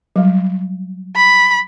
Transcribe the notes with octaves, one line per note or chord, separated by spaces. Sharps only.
F#3 G3
B5